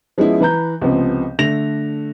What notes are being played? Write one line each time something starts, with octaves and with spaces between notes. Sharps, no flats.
F3 G#3 B3 C#4 E4
E3 B4 A#5 G6
C#2 C3 F3 B3 C4
D3 A3 A#6 F7